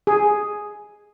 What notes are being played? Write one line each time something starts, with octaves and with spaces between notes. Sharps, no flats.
G#4